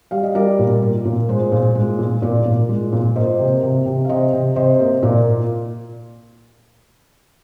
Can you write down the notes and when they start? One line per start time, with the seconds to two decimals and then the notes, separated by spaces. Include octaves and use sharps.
0.11 G3 F5
0.23 D#5
0.35 G3 A#4 D5
0.59 A#2
0.82 A#3
1.05 A#2
1.29 G#3 G#4 C5
1.52 A#2
1.75 G#3
1.98 A#2
2.22 A#2 A#4 D5
2.46 A#2
2.69 G#3
2.92 A#2
3.16 A#3 C5 D#5
3.39 C3
3.63 C3
3.86 C3
4.05 F5
4.09 C3 C5 D#5
4.33 C3
4.56 C3 C5 D#5
4.80 A#3
5.03 A#2 A#4 D5